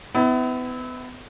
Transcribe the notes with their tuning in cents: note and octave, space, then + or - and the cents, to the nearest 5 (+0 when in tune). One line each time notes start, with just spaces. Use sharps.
B3 +30 E4 -25